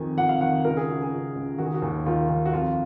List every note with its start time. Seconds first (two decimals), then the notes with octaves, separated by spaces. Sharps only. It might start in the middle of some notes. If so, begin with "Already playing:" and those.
Already playing: F2 D#3 G#5
0.17 F2 F#5
0.29 F5
0.41 D#3 F#5
0.64 C#2 A#4
0.77 G#4
0.88 C#3 F#4
1.02 G#4
1.12 C#2
1.35 C#2
1.58 D#3 F#4
1.66 G#4
1.74 F#4
1.82 D#2
2.06 D#3 F4
2.29 D#3
2.46 F#4
2.53 F2 F4